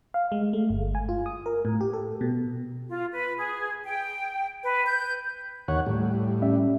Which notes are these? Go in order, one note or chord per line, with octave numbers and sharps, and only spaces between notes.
F5
G#3
A3
G1
G#5
F4
D#6
A#4
A2
G4
A4
B2
F4
B4
G#4
G5
B4
G6
D#2 C#5 F#5
A2 G3 G4
C#4 D5 E5